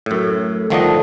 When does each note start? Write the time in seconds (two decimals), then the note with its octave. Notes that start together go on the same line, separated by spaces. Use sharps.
0.06 F#2 A2
0.70 G1 D#3 F3 A3 D4 D#5